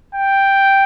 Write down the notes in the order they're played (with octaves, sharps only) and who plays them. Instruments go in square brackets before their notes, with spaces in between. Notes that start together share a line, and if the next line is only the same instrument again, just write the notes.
[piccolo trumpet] G5